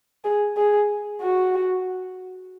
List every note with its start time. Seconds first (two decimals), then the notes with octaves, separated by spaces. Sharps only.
0.24 G#4
0.57 G#4
1.21 F#4